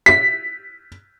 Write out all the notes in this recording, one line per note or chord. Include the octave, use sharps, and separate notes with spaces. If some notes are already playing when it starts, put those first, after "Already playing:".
B6